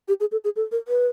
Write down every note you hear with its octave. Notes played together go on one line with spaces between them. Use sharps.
G4
G#4
A4
G#4
A4
A#4
B4